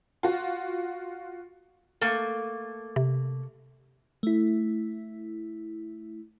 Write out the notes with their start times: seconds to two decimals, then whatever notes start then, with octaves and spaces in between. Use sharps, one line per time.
0.23 F4 F#4
2.01 A3 A#3
2.96 C3
4.23 A3 E4